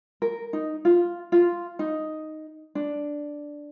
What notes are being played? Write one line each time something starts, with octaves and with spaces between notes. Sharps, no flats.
A#4
D#4
F4
F4
D#4
D4